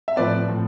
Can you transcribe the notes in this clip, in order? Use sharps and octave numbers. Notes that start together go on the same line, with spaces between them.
E5
A2 F3 C4 B4 D5
A2 F3 C4